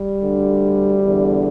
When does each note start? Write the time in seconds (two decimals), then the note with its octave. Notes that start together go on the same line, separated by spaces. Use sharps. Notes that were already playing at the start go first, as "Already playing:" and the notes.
Already playing: G3
0.23 D2 D3
1.05 E2 D3